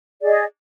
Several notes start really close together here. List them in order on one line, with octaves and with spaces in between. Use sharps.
D5 G#4 D#5